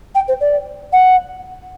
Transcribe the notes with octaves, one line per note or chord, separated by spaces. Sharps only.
G5
C5
D5
F#5